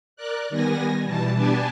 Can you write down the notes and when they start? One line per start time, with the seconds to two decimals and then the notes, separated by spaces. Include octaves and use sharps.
0.16 A#4 D5 F#6
0.49 D#3 G3 B3 G#5 A#6
1.04 B2 E3 G3 A5
1.36 B3 D4 G4 G#5 A5